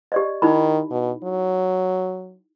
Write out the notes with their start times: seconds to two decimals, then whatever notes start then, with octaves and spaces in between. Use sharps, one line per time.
0.12 G4 D5 D#5
0.42 D#3 D#4 E4 B5
0.91 B2
1.24 F#3